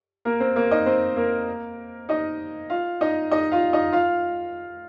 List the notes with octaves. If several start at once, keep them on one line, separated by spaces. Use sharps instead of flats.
A#3 A#4
C4 C5
A#3 A#4
D#4 D#5
C4 C5
A#3 A#4
D#4 D#5
F4 F5
D#4 D#5
D#4 D#5
F4 F5
D#4 D#5
F4 F5